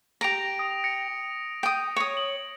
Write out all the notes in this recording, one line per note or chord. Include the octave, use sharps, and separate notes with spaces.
G4 A#5 A#6 D7 F7
D#6
A#6 C#7
G5 D#6
C#5 D#6
F#7